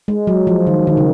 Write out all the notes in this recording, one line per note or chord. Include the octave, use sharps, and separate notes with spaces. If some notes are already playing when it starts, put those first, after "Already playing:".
G#3
F#3
F3
D#3
D#3
C#3